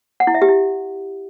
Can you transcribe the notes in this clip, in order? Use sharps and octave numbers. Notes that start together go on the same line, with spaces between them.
F#5
E4
E5
G4
E4